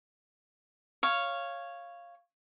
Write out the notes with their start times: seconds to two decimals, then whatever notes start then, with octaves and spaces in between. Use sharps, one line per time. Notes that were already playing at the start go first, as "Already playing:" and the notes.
1.03 C#5 F5